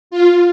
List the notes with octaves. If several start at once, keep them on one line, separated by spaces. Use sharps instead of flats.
F4